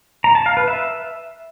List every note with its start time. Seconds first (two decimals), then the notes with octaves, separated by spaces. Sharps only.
0.24 A#5
0.35 A5
0.46 F5
0.57 B4
0.68 E5